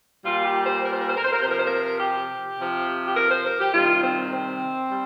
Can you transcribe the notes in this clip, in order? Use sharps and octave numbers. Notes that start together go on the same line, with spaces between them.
A#2 G3 F4
G4
C5
A#4
C5
A#4
C5
A#4
C5
A#4
C3 F3 A#4 C5
C5
A#4
G4
C3 F3
G4
A#4
C5
A#4
G4
C3 D#3 G3 F4
C4
C4
G3